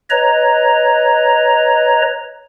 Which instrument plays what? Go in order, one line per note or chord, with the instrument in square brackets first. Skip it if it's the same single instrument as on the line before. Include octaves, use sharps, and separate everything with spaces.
[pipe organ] B4 C#5 D#5 A#5